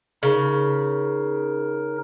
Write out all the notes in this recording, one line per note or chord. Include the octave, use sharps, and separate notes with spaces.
C#3 D#4 A#4